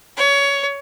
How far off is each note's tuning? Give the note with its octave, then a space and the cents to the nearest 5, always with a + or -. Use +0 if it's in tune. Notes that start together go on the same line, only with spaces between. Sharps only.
C#5 +20